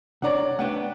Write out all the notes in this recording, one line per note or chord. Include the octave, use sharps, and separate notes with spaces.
C2 D4 C#5 D5 F#5 A#5
A3 B3 D4 F#5 G5